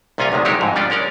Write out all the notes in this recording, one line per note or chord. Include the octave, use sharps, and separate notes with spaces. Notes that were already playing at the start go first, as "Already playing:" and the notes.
C2 A#2 C#4 F4 G#5 A#5
D2 C3 D#3 G#3
F#3 G#3 D#4 E4 G4 A#4
F2 G#2
G3 C#4 D4 F4 D5
G#3 C#4 A#4 D5